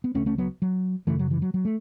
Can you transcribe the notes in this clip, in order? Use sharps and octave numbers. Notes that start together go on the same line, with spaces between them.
B3
C#2 C#3 A3 C#4
A3 C#4
F#3 B3
F#3
F#2 C#3 E3 A3
F#3
E3
F#3
F#3
A3